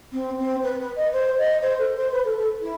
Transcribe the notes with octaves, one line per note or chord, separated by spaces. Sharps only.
C4
C4
B4
B4
D#5
C5
D#5
C5
A4
C5
B4
A4
A4
E4